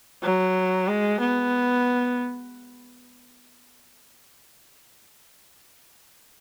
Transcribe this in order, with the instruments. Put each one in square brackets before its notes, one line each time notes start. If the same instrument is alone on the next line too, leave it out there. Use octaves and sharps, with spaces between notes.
[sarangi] F#3
G#3
B3